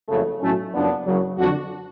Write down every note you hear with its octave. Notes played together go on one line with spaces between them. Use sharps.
F#1 F2 C#3 F#3 A3
B1 A2 F#3 A3 C#4
F#1 F#2 F3 B3 D4
F#1 F#2 C#3 F#3
F2 D3 F#3 D4 F#4